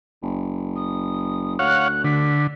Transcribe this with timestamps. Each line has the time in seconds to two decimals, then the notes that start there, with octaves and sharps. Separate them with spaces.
0.22 F#1
0.76 D#6
1.59 D2 C#5 F5 F#5 F#6
2.04 D3 B6